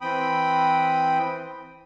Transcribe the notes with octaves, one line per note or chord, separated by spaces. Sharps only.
E3 C4 G5 B5 D#6